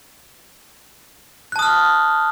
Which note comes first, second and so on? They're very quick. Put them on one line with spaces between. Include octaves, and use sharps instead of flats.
F#6 A5 D#6 F6